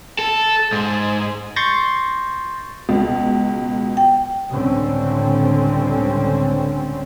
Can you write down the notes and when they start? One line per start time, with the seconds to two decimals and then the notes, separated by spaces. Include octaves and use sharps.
0.19 A4
0.73 G#2
1.56 C6 C#6 G6 A6 A#6
2.89 C#2 B2
3.97 G5
4.50 C#2 A2 D3 G3 C4 C#4